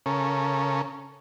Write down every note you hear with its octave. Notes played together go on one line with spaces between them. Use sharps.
C#3 C#4 A4 A#4